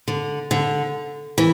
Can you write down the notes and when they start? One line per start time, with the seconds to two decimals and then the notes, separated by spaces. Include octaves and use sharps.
0.08 D3
0.51 D3
1.38 E3